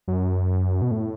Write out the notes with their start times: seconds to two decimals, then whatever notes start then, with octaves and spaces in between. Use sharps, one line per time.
0.08 F#2
0.82 B2
0.91 A2